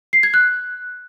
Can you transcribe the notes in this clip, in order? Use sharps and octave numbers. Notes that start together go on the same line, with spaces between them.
C7
G#6
F#6